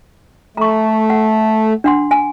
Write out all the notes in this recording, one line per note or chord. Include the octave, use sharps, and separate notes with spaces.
A3 A#5 C#6
F#5
D4 F#5 C6
G#5